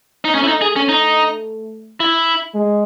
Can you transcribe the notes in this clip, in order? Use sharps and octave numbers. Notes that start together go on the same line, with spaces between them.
D#4
A3 C#4
E4
D#4
G#4
C#4
D#4
E4
G#3